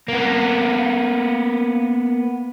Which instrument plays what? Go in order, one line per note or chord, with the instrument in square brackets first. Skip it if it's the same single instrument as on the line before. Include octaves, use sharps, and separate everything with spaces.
[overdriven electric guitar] A#3 B3